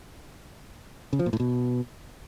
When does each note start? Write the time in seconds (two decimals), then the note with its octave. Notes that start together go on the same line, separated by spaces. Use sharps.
1.13 C#3
1.19 F3
1.26 A#2
1.33 A2
1.40 B2